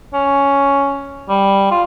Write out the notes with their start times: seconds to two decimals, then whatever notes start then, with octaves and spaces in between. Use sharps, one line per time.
0.13 C#4
1.29 G3
1.71 F4